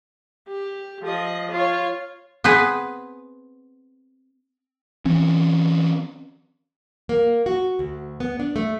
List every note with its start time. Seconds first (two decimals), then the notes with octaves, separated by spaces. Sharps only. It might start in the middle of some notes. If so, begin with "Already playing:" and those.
0.49 G4
1.03 F3 D#5
1.51 F4 C#5
2.44 B3 C4 G#4 B4
5.05 E3 C4 C#4
7.09 A#3
7.46 F#4
7.79 D2
8.20 B3
8.39 D4
8.56 A3